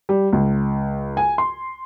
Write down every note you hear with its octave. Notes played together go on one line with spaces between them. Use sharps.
G3
C#2
G#5
C6